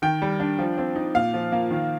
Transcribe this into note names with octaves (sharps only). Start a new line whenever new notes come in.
D#3 G5
G3
D4
F3
C4
D#4
A#2 F5
F3
A#3
D#3